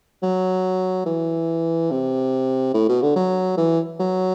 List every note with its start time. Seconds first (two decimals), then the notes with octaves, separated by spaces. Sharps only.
0.22 F#3
1.06 E3
1.91 C3
2.74 A2
2.89 B2
3.02 D3
3.16 F#3
3.57 E3
4.00 F#3